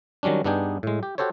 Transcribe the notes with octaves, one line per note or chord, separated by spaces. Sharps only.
D#3 F#3 G3 C#4 D4
G2 B3 D4 D#4 G#4 G5
A2 G#3
G4
F#4 G4 A4 C5 C#5